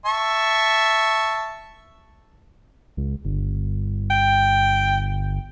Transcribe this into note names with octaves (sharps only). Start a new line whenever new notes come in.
E5 A5 C#6
C#2
G1
G5